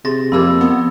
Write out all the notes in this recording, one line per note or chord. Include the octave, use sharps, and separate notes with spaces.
C3 G#4 C6 A6 A#6
F2 A#3 G4 A#4 B5 E6 G#6
B3